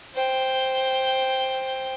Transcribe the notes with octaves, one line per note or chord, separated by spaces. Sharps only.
C5 G5